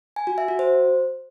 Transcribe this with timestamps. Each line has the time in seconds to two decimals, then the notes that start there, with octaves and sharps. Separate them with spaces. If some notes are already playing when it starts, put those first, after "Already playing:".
0.16 G#5
0.27 F#4
0.38 E5
0.48 F#4
0.59 C5